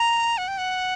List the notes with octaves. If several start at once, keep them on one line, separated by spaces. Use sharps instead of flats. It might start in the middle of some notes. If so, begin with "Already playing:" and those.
Already playing: A#5
F#5
G5
F#5